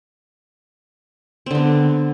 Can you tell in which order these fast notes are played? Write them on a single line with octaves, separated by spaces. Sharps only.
C4 D3 B3